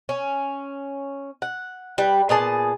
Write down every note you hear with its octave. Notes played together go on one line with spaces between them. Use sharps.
C#4
F#5
G3 B4
A#2 B3 G#4 A5